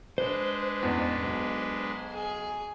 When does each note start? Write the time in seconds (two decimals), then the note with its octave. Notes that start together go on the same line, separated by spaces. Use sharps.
0.18 G#3 D4 B4 C5
0.82 A1 E2
1.22 B1
2.13 G#4